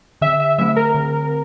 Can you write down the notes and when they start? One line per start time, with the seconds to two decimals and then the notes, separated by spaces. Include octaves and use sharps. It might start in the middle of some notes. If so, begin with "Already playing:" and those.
0.22 D3 E5
0.40 E5
0.58 F#3 A3 C4 E5
0.76 A#4
0.94 D3